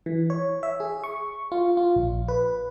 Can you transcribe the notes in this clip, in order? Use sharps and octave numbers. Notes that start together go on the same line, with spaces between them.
E3
C#5
E5
G#4
C#6
F4
F4
A#1
B4